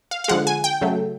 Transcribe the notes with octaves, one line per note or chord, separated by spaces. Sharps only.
F5
F5
D3 F3 G#3 F#5
G#5
G5
C#3 F#3 A3